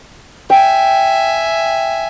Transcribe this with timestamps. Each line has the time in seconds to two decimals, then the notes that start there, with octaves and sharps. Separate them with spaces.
0.50 E5 G5 G#5